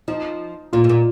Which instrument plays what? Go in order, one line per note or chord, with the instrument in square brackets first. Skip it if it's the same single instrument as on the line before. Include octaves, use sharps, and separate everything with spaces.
[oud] F3 [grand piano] D#4
[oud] A#2 [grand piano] F4
[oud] G#2
A#2